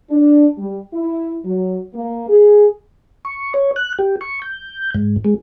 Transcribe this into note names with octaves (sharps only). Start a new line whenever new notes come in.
D4
G3
E4
F#3
A#3
G#4
C#6
C#5
F#6
G4
C#6
G6
G#2
G#3